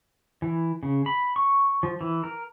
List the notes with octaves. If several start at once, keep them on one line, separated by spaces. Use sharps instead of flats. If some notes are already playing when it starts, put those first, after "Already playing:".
E3
C#3
B5
C#6
F3
E3
A#4